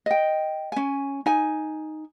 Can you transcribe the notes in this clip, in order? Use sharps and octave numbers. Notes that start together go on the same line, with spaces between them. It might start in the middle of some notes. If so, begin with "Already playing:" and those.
D#5 G5
C#4 G#5
D#4 G#5